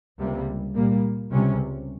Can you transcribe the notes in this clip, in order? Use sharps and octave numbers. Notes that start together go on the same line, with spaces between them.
C#2 C3 G3 A#3
A#2 G3 A#3
C#2 C3 G3 C#4